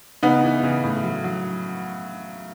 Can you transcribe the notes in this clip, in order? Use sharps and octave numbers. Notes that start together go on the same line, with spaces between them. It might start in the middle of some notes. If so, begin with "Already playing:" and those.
C#3 B3 D#4
E3
C#3
A2
F#3
F#3